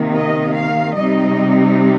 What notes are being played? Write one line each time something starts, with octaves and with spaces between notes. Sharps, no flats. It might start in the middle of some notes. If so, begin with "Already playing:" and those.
Already playing: C3 D#3 A#3
D#5
F5
C3 G3 C4 D#4 D#5